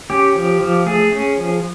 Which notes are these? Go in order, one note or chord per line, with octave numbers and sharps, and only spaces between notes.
C#4 G4
F3
F3
A3 G#4
C#4
F3